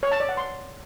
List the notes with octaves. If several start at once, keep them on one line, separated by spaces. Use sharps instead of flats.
C#5
A5
D5
F#5
C6